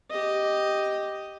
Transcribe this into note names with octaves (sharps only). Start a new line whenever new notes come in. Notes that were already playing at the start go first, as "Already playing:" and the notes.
G4 D#5